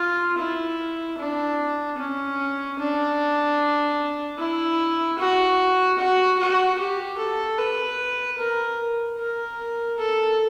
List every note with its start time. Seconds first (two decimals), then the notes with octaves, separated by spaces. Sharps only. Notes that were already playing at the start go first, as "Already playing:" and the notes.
Already playing: F4
0.38 E4
1.18 D4
1.99 C#4
2.78 D4
4.38 E4
5.18 F#4
5.98 F#4
6.38 F#4
6.78 G4
7.18 A4
7.58 B4
8.38 A#4
9.19 A#4
9.98 A4